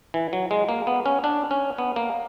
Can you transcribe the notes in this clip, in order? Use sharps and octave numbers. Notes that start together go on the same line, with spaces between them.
E3
F#3
G#3
A#3
B3
C#4
D4
C#4
B3
A#3